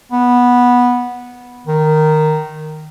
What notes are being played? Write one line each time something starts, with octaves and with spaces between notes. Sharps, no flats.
B3
D#3